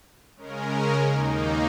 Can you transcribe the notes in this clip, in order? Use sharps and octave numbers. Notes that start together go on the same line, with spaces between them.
C#3 G#3 C#4 A#4
D#2 D#3 A#3 D#4